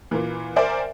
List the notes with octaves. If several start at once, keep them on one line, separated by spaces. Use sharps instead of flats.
A#2 E3
A#4 C5 D5 E5 G5 G#5